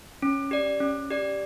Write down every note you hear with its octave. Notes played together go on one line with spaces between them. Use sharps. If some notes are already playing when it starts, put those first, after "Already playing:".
C#4
G4 D5
C#4
G4 D5